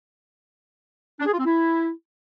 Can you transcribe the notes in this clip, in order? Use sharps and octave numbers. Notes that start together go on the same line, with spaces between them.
D4
G#4
F4
C4
E4